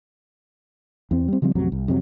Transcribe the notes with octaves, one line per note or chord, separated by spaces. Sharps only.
E2 C4
G3 C4
C#3 F3 G3 C4
A1 F2 C3 F#3
C2
F2 C3 F3 F#3